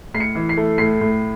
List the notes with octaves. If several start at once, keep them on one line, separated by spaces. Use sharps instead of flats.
A2 C7
C#7
E3
C7
A3
A2 C7
A2